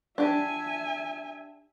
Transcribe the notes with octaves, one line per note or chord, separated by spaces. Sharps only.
D4 G4 E5 G#5